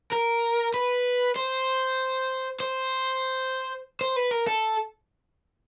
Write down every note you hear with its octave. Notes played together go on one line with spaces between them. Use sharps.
A#4
B4
C5
C5
C5
B4
A#4
A4